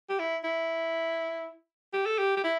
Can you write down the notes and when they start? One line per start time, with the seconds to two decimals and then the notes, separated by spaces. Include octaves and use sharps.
0.09 G4
0.19 E4
0.44 E4
1.93 G4
2.06 A4
2.18 G4
2.36 G4
2.44 E4